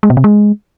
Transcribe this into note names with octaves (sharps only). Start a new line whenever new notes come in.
G#3
B2
C3
G#3